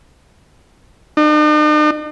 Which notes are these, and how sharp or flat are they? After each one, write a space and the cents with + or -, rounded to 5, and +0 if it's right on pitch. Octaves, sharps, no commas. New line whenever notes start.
D#4 -45